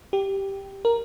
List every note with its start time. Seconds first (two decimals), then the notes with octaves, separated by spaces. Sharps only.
0.13 G4
0.85 A#4